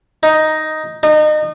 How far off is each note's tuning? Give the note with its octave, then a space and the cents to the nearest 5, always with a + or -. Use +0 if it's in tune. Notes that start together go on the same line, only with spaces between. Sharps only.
D#4 +5
D#4 -30